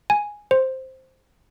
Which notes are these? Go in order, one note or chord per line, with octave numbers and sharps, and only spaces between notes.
G#5
C5